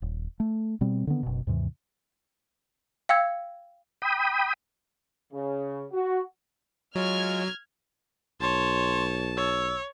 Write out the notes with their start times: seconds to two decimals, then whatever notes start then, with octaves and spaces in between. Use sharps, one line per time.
0.02 D#1
0.40 A3
0.81 B2 G3 C4
1.07 D3 D#3 B3
1.23 F#1 B2
1.47 D#2 G#2 C3 E3
3.09 F5 G5 E6 G#6
4.02 G5 B5 D#6
5.33 C#3
5.92 F#4
6.95 F#3 G#3 F4 C#5 F6 G#6
8.41 B1 C#5 A5 C6
9.37 C#5 E6